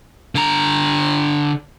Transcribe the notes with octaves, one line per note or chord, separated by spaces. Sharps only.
D3 A#5